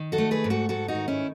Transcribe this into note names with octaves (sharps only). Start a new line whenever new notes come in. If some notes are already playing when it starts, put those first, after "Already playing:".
Already playing: D#3
F#4 A4
A3
G#4 B4
G#2
F#4 A4
G#2 F#4 A4
D#4 F#4
D#3
C#4 E4